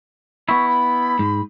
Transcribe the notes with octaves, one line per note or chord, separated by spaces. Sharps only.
B3 E4 C#6
B5
G#2